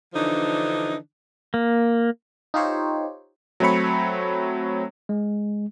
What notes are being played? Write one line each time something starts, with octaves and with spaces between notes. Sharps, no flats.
D3 E3 F3 D4 D#4
A#3
D#4 F4 G4 C5 C#5
F#3 A3 C4 C#5 B5 C#7
G#3